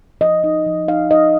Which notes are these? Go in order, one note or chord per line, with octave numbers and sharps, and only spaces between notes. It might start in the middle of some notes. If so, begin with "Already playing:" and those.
F3 D#5
D#4
F3
D#4 F5
D#4 D#5